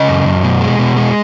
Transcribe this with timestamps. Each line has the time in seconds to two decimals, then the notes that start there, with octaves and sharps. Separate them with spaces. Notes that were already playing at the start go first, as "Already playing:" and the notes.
Already playing: C#3 D#5
0.08 F#2
0.26 F#2
0.43 B2
0.61 G#3
0.79 B2
0.97 G#3